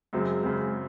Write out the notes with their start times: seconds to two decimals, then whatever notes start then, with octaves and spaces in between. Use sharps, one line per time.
0.13 F#2 C#3 F#3 G#3 C4
0.43 F#2 C#3 F#3 C4